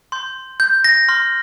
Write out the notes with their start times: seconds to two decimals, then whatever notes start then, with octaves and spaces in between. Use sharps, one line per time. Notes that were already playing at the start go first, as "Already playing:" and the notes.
0.12 C6 G6
0.60 G6
0.84 A#6
1.09 C6 F6